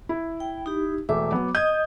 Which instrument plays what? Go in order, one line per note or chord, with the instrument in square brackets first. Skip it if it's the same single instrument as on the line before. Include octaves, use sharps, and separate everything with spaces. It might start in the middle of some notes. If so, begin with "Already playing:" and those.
[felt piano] E4
[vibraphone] G5
D#4 G4
[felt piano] E1 A3 E5 [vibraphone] D6
[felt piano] F#3 B3
[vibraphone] D#5 D#6 [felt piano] G6 G#6